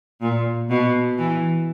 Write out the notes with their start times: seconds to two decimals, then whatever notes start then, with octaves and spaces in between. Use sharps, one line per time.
0.21 A#2
0.69 B2
1.17 E3